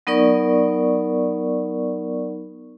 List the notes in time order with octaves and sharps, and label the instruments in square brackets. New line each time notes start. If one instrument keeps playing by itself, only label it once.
[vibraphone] F#3 B3 D#4 A#4 D5 C#6